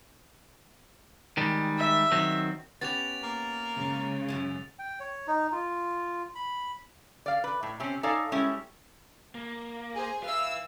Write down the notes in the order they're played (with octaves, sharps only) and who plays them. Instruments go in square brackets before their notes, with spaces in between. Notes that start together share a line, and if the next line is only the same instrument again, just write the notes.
[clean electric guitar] D#3 G3 G#3
[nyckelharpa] E5
[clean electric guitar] D#3 F#3 C4
[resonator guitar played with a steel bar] B3 C#4 G4 [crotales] A6 F7
[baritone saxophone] A#3
[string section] C#3 G#3
[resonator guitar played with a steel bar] F#2 A#2 C#4
[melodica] G5
C#5
D#4
F4
B5
[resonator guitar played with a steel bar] D5 F5
B4
A2
C3 C4 C#4
D#4 A4 C#5 D5 F5 G#5
G3 G#3 C#4 E4
[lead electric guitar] A#3
[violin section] G#4 C5
[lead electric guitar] B4 E5 [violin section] F5 E6